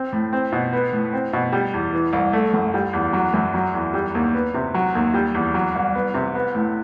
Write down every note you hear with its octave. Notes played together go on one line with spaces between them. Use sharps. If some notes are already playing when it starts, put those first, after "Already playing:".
Already playing: C4
A2
C4
B2
B3
A2
C4
B2
G3
E2
E3
C2
A3
F#2
G3
E2
F#3
F#2
F#3
E2
G3
D#2
B3
C3
F#3
D#2
G3
E2
F#3
C2
B3
C3
B3
A2